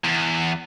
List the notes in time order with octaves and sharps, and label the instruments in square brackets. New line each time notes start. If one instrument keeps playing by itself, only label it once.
[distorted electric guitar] E2